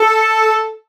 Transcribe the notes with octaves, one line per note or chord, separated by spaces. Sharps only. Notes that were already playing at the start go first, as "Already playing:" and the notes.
Already playing: A4